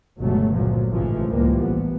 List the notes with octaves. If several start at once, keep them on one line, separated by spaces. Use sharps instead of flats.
G1 C#2 B2 F#3 A3
A#2 F3 F#3
A1 G#2 C#3 E3 F3 A3
C#2 A2 E3 F3 G3 A#3
A1 B3